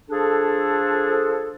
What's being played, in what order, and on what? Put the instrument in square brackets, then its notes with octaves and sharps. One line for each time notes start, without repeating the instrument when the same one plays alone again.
[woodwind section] F3 D4 G#4 A4